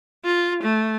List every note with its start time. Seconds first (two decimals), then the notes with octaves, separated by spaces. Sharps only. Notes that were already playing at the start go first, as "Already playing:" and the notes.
0.25 F4
0.63 A3